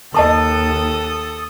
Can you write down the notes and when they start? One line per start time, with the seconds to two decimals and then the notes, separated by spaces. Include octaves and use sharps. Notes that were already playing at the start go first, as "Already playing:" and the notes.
0.14 D#2 A4 D#5 A5 C6 D#6